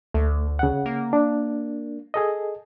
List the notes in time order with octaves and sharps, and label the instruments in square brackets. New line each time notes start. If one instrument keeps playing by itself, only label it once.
[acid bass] D2 [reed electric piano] A3
[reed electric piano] C#3 F#5
[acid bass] A#3
[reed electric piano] D4
G#4 A4 D#5